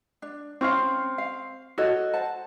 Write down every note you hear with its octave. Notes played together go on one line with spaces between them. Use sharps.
D4
C4 C#4 F5 C#6 F6
F5
F#4 A4 C#5 D#5
C5 F#5 A5